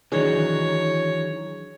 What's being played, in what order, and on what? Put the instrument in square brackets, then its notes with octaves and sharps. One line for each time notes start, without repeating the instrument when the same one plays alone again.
[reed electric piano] D#3 D4 G#4 [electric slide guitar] E3 F#3 D#4 [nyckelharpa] C#5